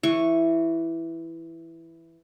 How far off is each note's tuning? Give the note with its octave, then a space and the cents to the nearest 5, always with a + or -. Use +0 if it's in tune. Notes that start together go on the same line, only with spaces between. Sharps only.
E3 +5 C#6 -5